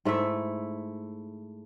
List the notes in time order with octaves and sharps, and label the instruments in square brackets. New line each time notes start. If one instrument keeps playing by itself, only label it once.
[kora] G#2 A3 E4 E5